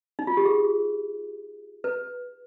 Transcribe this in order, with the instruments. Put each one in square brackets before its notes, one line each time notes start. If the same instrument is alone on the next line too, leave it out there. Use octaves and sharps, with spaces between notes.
[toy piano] D#4
F4
G4
G#4
B4